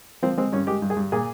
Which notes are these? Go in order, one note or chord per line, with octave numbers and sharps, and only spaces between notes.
F3 C4
G#3 C4
G2 C#4
G#3 G4
G2
G#4
G2
A#2 G#4